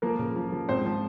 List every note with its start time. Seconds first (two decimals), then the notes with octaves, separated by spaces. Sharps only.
0.02 F3 A#3 A#4
0.19 C#3
0.36 F3
0.52 F3
0.68 G#2 C4 C5
0.86 F3